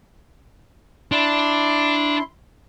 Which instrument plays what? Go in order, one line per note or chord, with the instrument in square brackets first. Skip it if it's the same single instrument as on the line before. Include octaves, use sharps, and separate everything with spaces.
[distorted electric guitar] D4 [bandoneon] E4 C6